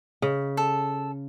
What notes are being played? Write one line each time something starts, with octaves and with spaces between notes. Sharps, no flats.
C#3
A4